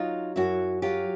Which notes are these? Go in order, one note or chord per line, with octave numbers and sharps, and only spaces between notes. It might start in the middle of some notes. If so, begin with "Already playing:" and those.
Already playing: F#3 D#4 F4
F#2 E4 F#4
F#3 F4 G4